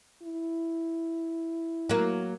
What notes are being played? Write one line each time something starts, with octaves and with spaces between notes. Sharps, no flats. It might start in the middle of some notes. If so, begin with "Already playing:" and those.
E4
F#3 A#3